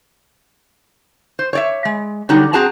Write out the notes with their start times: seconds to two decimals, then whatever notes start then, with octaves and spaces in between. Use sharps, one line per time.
1.39 C5
1.53 C#5 D5 E5
1.85 G#3
2.29 D3 F#3 G3 D#4
2.53 C4 F#4 G#4 A5 A#5